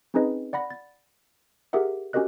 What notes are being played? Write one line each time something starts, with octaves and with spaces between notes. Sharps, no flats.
C4 C#4 D#4 G#4 B4 D#5
D5 F#5 B5 A#6
A6
G4 G#4 A#4 E5 F#5
C#4 F#4 G4 A#4 D#5 F#6